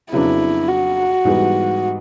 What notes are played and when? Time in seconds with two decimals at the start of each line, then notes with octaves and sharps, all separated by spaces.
0.12 F2 C#3 F#3 B3 D4 E4
0.69 F#4
1.25 G#2 E3 G3 B3